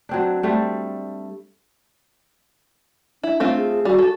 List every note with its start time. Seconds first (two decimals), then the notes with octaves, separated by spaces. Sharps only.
0.09 F#3 C4 D4
0.43 G3 A3 C4
3.23 D4 E4
3.40 A3 C4 F4
3.57 G#4
3.85 G3 F#4
3.99 A4